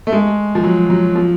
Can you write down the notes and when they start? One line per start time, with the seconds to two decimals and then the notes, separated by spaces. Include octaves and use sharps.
0.07 A3
0.12 G#3
0.55 F3
0.64 F#3
0.90 F#3
1.15 F3